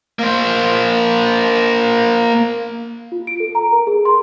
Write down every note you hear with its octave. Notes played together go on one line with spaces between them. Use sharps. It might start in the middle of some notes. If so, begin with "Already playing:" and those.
A#3 C5
F4
D7
A4
A#5
A#4
G#4
C6